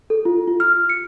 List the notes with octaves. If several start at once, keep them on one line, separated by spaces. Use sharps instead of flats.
A4
F4
F4
F6
C#7